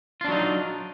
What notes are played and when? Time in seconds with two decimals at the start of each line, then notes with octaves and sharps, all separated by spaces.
0.21 F4
0.25 D4
0.28 F#3
0.32 D#4